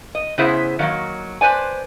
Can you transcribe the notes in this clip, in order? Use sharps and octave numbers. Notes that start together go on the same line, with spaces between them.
D#5
C#3 B3 E4 G#4 C5 E5
D#3 F#3 A#3
B4 C5 D5 G#5